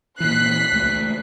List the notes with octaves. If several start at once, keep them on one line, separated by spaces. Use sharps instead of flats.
A#2 E3 F#6 B6 C7
C#2 A3